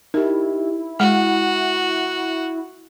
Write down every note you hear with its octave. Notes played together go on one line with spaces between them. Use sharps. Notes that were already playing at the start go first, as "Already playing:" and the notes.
D#4 E4 G4 A#4
G#3 F#4 G#4 F#5